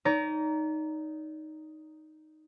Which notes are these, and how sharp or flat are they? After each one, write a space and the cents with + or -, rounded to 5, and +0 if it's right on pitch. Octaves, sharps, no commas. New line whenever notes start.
D#4 +0 D5 -40 A#5 +0